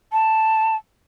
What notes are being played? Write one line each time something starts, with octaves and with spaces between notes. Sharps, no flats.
A5